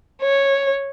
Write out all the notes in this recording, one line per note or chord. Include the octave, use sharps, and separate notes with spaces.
C#5